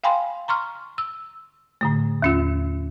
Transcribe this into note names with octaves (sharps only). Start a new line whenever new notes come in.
F5 G5 G#5 B5 C6
A#5 C6 C#6 F6
E6
A2 D3 A3
D#2 C#4 F4